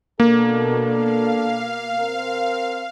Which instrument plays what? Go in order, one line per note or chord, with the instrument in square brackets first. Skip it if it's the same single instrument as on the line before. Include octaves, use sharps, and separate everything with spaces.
[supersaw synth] B2 [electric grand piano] A#3 [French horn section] D4 A4
[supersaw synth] F5
[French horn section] C4 A#4